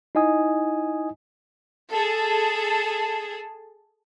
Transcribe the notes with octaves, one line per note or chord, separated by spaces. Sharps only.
D#4 E4 D#5 G#5 D#6
G#4 A4